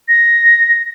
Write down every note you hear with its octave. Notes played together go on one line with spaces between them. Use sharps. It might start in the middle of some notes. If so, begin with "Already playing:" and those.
A#6